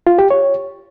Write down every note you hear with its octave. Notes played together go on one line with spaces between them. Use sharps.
F4
G4
C#5